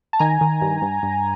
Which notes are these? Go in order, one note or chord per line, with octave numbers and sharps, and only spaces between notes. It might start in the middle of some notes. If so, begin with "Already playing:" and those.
A5
D#3 G#5 A#5
D#3
G2
G2
G2